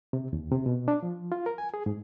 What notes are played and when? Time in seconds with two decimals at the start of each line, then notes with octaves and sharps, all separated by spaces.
0.13 C3
0.33 D#2
0.52 C3
0.66 B2
0.88 D4
1.03 F3
1.32 F4
1.46 A#4
1.58 G#5
1.74 G#4
1.86 G#2